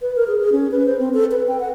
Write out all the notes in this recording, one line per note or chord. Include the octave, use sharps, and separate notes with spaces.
B4
A#4
G#4
G#4
C#4
B4
C5
C4
A4
B4
G5
F#5